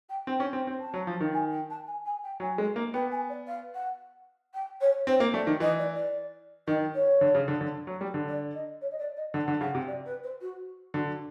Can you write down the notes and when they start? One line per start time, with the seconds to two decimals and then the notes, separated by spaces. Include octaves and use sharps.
0.09 G5
0.27 C4 G5
0.40 C#4
0.53 C4
0.67 C4
0.80 A5
0.94 F#3
1.07 F3
1.20 D#3
1.33 G#5
1.51 G5
1.70 A5
1.87 G#5
2.05 G#5
2.23 G5
2.40 F#3 G#5
2.58 G#3
2.76 A#3
2.93 B3 G5
3.11 G#5
3.29 D5
3.47 F5
3.74 F#5
4.54 G5
4.81 C#5
5.07 C4 C5
5.20 A#3
5.34 A3 D5
5.47 D#3
5.60 E3 D#5
5.79 D5
5.96 D5
6.67 D#3 D#5
6.95 C#5
7.21 D3
7.35 C#3
7.48 D3
7.61 D3
7.87 F#3
8.01 G3
8.14 D3
8.28 D5
8.54 D#5
8.81 C#5
8.91 D#5
8.98 D5
9.16 D#5
9.34 D3 F#5
9.48 D3
9.61 C#3 F#5
9.75 C3
9.88 D5
10.05 B4
10.23 C5
10.41 F#4
10.94 D3 F#4